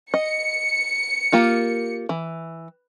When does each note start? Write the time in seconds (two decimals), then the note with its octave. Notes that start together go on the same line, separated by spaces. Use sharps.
0.14 D#5 C#7
1.32 A#3 F4 G4
2.09 E3